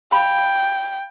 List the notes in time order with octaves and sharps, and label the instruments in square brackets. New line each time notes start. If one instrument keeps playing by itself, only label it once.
[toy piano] F5 B5 [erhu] G5